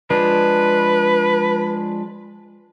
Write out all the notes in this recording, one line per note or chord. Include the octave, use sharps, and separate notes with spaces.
F3 G#3 D4 B4